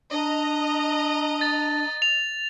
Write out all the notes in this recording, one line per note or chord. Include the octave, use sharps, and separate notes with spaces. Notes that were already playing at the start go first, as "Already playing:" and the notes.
D4 D#5 A#5
A6
F7